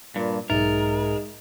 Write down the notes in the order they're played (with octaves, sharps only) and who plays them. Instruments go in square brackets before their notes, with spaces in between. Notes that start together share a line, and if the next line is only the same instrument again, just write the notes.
[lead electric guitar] G2 [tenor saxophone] A#2
[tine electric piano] B1 G#2 E5 [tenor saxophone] G#3 [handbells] D#4 [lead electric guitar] A#4